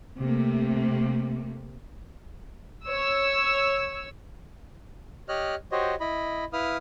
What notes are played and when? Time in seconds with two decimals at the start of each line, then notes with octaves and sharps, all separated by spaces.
0.20 C3 A3 A#3
2.85 C#5 E6
5.29 G4 C#5 D#5 F6 F#6
5.72 F#4 G4 C5 C#5 D#5
6.00 E4 D#5 B5
6.53 E4 B4 F5 D#6 F6